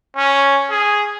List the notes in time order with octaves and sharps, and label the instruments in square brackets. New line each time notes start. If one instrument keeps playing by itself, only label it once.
[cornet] C#4
G#4